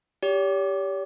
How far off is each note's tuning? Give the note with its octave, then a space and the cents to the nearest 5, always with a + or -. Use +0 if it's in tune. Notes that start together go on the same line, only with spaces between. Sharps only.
G4 +5 C#5 +45